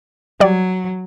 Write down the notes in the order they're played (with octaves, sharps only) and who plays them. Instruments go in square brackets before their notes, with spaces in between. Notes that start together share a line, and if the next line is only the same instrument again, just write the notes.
[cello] F#3 [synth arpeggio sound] G3 D5